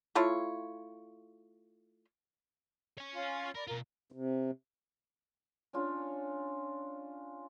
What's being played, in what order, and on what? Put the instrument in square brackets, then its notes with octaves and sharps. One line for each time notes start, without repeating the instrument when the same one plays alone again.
[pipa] A3 E4 F4 C#5
[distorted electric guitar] C#5 G#5
[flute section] C#4 F4
[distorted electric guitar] A#4 [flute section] D5 B5
[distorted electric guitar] B2 F4 [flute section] A#4
[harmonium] C3
[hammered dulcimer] C#4 D4 F4 A4